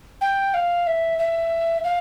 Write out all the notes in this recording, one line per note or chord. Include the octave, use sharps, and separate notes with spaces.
G5
F5
E5
E5
F5